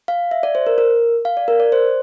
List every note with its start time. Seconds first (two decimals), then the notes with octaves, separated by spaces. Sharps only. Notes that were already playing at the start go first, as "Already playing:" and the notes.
0.08 F5
0.31 E5
0.43 D5
0.55 C5
0.67 A#4
0.78 A#4
1.25 F5
1.37 D5
1.48 A#4
1.60 D5
1.72 C5